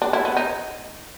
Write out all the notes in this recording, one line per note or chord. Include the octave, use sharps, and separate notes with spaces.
D4
E4
B3
D#4